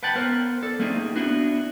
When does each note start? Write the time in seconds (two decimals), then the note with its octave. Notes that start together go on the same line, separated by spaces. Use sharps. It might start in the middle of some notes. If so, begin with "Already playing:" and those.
0.03 B4 F#5 G5 A5 B5
0.15 B3 A#4 C5
0.63 A4 D5
0.79 A3 A#3 C4 D#4 G#4
1.16 B3 D4 E4 F#4